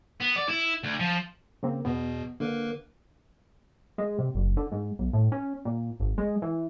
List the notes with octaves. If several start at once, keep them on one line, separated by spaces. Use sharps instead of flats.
B3
D5
E4
D2
F3
C#3 A#3 C4
E2 B2 B3
D3 A#3 A#4 B4
G#3
C3
F#1
D3
G#2
B1
A2
C#4
A#2
G#1
G#3
E3